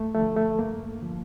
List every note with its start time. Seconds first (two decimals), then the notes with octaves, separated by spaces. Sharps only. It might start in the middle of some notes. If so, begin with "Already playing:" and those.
Already playing: G2 A3
0.15 D3 F3 A3
0.36 A3
0.58 G2 A#3
1.01 D3 F3